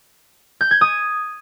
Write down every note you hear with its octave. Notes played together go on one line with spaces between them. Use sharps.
G6
G#6
D#6